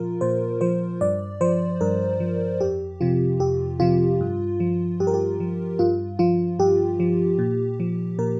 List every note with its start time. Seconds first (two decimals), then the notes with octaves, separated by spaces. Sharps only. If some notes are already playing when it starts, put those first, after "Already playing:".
Already playing: A#2 F3 F4 A#4
0.21 A#2 C5
0.61 F3 C5
1.01 G2 D5
1.41 F3 C5
1.81 G2 A#4
2.20 F3
2.61 F2 G4
3.01 C3 F3 F4
3.40 F2 G4
3.80 C3 F3 F4
4.21 G2
4.60 F3
5.00 G2 G4
5.07 A#4
5.14 G4
5.40 F3
5.79 G2 F4
6.19 F3 F4
6.59 G2 G4
7.00 F3
7.39 A#2
7.80 F3
8.19 A#2 A#4